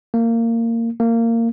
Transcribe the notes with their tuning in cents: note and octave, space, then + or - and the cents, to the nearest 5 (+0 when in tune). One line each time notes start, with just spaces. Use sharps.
A#3 -20
A#3 -20